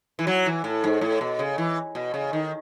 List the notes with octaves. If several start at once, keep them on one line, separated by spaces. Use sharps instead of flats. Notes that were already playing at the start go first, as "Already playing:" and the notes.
E3
F#3
E3
A2
G#2
A2
B2
C#3
E3
B2
C#3
D#3